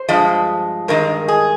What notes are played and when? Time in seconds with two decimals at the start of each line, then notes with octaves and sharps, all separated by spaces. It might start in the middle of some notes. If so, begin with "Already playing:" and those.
Already playing: C5
0.09 G2 F3 G#3
0.88 G2 D#3 G#3 A#4
1.28 G#4